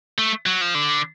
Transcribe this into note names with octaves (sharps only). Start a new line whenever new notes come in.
A3
F#3
F3
D3